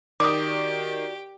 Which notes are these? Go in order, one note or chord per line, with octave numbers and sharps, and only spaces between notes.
D#3 F#4 G4 D5 D6 D#6